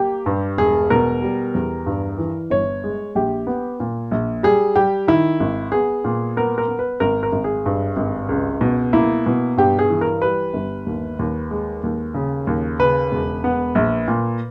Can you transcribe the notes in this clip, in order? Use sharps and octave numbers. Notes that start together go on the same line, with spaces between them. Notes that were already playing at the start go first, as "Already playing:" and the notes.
Already playing: A#3 G4
G2
E1 G#4
B2 A#4
G3
E2
G2
E3
G1 C#5
G#3
A#1 G4
B3
A#2
A#1
G3 G#4
G3 G4
D#3 E4
G#1
B3 G#4
A#2
B3 A#4
A#4
B3
B4
G#1 A#4
A#4
G#1
G#4
G2
G#1
C#2
B2
A#3 E4
B2
G2 G4
G#4
E3
A#4
G3 B4
G1
D#2
D#2
G#3
D#2
C#3
D#2
C#3 B4
E1
B3
A#1
A#2